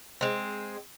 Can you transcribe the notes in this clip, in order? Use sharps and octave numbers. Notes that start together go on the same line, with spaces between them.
G#3 C4